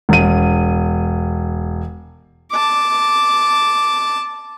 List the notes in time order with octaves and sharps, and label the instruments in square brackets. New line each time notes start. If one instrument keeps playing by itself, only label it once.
[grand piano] E1 D#7
[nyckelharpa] A5 D6